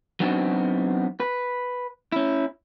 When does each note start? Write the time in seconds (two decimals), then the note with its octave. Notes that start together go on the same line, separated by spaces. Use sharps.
0.20 F#3 B3 C4 D4 D#4 F#4
1.20 B4
2.12 C#4 E4